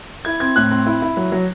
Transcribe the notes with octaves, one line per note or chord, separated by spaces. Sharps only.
E4 G#6
C4 G#6
A2 F#6
C4
E4
E4
F#3
F#3